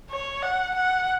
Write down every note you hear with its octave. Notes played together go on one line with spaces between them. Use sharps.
C#5
F#5
F#5